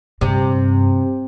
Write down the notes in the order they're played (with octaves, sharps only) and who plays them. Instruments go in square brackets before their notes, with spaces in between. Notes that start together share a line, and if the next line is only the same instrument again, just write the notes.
[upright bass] G2 [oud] C3